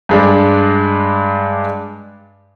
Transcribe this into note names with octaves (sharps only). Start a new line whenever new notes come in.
G2 G#3 D4